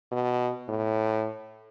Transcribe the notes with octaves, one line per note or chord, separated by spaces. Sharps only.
B2
A2